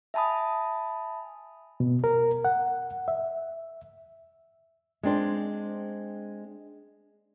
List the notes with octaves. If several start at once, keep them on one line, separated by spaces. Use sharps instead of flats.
E5 G#5 A5 B5 D#6
B2
A#4
F#5
E5
G#3 C4 D4 C5